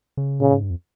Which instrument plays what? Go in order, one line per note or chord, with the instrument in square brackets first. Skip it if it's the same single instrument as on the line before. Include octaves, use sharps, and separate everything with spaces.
[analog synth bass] C#3
[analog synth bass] A#2 [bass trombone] C#3
[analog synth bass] G#2
G2
F2